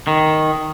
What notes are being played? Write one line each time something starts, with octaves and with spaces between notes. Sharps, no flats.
D#3